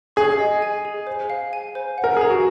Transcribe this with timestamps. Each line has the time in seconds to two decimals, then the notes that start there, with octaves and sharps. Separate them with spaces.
0.16 G#4 C#6
0.39 D#5
0.62 G#5
0.85 G#4
1.07 C5
1.30 F5
1.53 G#5
1.75 C5
1.98 F#5
2.04 A#4
2.17 G#4 A#5
2.30 F#4